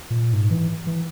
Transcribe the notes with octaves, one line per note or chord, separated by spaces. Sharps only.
A#2
G#2
E3
E3